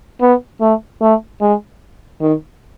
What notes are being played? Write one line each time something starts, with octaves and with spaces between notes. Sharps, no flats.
B3
A3
A3
G#3
D#3